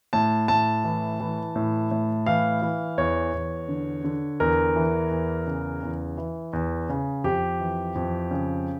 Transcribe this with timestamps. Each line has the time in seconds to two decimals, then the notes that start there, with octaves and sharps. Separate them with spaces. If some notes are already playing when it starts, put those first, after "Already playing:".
0.13 A2 A5
0.48 A2 A5
0.84 E3
1.20 E3
1.55 A2
1.91 A2
2.26 E3 F5
2.62 E3
2.98 E2 C#5
3.34 E2
3.68 D3
4.04 D3
4.40 E2 A#4
4.76 E3
5.11 E2
5.47 C#3
5.83 E2
6.17 E3
6.53 E2
6.89 C#3
7.24 F2 G4
7.60 E3
7.95 F2
8.31 C#3